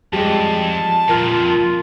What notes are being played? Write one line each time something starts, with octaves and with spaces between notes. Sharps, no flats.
F2 G3 G#3 A5
F2 A#2 F4 A#4 F6